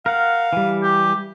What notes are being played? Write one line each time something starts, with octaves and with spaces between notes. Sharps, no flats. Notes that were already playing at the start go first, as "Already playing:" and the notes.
A#4 F5 F#5
E3 G3
G4